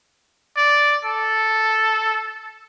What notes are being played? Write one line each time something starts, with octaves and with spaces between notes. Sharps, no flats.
D5
A4